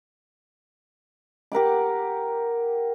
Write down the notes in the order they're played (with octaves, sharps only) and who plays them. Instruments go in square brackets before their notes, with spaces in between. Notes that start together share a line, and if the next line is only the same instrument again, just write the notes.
[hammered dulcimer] G4 A#4 F#5 D6